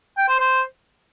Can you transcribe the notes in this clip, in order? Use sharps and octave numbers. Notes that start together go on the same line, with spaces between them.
G5
C5
C5